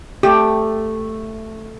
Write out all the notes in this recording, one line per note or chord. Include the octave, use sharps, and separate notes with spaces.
A3 G4